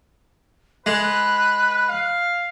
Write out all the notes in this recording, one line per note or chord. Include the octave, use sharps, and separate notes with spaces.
G#3 B4 F#6
F5